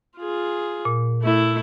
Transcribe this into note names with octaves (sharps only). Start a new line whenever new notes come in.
F4 G#4
A#2
A3 E4